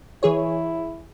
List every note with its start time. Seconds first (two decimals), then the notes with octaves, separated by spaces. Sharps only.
0.23 E3 E4 G#4 C#5